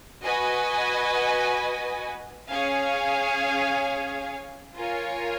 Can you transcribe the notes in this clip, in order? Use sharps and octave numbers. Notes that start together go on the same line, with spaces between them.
F#4 B4 D#5 G#5
C#4 G#4 C#5 F5 G#5
F4 A#4 C#5 G#5